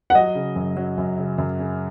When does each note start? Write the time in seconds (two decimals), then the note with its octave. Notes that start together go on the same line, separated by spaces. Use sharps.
0.10 F#5
0.15 F#3 D#5
0.35 C#3
0.56 F#2
0.77 F#3
0.98 F#2
1.18 C#3
1.38 F#2
1.59 C#3